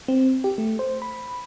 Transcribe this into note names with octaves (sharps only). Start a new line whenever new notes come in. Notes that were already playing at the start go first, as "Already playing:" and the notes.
C4
G4
A3
C5
B5